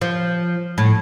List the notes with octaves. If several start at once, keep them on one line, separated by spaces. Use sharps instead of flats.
F3
A2